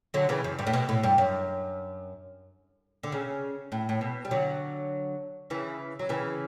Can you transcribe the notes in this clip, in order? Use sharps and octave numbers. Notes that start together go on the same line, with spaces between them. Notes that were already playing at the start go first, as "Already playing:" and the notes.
D3 F#3
C#3 E3
F#2
G2
A2
B2
A2
G2
F#2
D3
C#3
A2
A2
B2
G3
D3 F#3
C#3 E3
F#3
C#3 E3